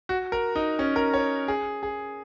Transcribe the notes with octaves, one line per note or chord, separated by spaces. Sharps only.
F#4
A#4
D#4
C#4
A#4
C#5
G#4
G#4